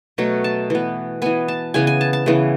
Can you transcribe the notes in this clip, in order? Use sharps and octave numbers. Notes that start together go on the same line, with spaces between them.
B2 F#3 A3
A5
E3 B3
E3 B3 G#5
A5
C#3 E3 B3 G#5
G#5
A5
A5
C#3 E3 B3